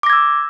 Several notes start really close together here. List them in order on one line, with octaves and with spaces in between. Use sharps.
D6 A#6 G#6 E6